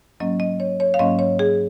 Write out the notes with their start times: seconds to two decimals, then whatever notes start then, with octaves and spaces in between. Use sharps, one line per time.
0.20 G#2 F#3 A#3 C#4 D#5
0.40 D#5
0.60 C#5
0.80 C#5
0.94 F5
0.99 G#2 F#3 A#3 C#4 D#5
1.19 C#5
1.39 G#4